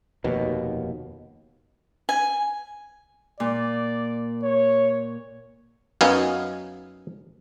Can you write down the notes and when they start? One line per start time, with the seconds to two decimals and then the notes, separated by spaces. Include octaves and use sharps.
0.24 F1 D#2 B2
2.09 G#5
3.40 A#2 D5
4.43 C#5
6.01 F#2 B3 D#4 F5 G#5